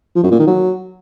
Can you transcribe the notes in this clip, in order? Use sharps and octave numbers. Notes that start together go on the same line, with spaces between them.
F3
F#2
A#2
D#3
F#3